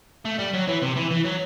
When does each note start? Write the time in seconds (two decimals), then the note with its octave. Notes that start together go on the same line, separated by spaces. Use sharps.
0.25 A3
0.39 G3
0.54 F#3
0.67 E3
0.82 C3
0.96 E3
1.11 E3
1.25 F#3